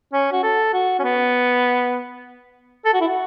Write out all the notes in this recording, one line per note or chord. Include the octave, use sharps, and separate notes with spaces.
C#4
F#4
A4
F#4
C#4
B3
A4
F#4
E4
F#4